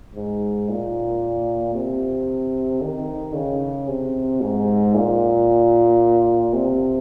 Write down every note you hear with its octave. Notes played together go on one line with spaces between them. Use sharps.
G#2
A#2
C3
D#3
C#3
C3
G#2
A#2
C3